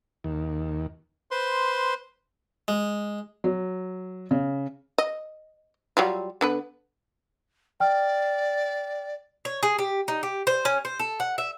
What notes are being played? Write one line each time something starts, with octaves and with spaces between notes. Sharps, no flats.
D#2
B4 C5 C6
G#3
F#3
C#3
D#5
F#3 G3 F4
D3 B3 B4
D5 G5 F6
C#5
G#4
G4
D#4
G4
C5
C#4
C5
A4
F#5
E5